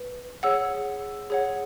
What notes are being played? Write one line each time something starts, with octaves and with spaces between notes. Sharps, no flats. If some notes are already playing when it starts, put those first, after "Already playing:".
Already playing: B4
G#4 C#5 F#5 E6
G#4 C#5 F#5